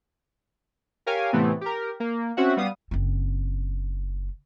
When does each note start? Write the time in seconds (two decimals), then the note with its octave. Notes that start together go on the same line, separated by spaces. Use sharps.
1.06 G4 A#4 C#5 F5 G#5
1.33 A2 C3 E3 A3 B3 C4
1.61 G4 A#4
2.00 A#3
2.37 C4 C#4 F#4 E5 F#5
2.57 G3 B3 F5 D#6
2.91 F#1 C4